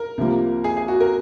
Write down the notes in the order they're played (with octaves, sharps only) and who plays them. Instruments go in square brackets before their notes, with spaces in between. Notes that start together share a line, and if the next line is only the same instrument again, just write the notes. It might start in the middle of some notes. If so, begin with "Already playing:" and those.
Already playing: [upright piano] A#4
[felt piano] C2 C3 F3 A#3
[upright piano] G#4
G#4
F#4
A#4